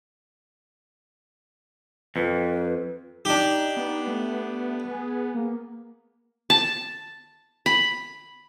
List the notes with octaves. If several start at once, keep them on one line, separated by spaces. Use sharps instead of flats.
F2 B4
D4 D#4 G4
B3
A3
G#4
A#3
A5
B5